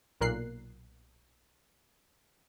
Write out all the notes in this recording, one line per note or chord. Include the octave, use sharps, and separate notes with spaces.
B1 A#2 A#4 F#6 C7